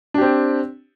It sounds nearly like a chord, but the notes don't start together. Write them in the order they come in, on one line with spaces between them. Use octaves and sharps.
D4 G4 C4